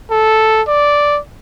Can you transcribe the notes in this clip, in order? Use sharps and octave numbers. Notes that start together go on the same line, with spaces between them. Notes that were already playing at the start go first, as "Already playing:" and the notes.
A4
D5